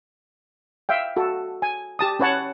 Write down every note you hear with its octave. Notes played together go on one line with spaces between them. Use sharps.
E5 F5 G5
F#4 A4
G#5
G4 A5 D#6
C#4 B4 C#5 F#5 A5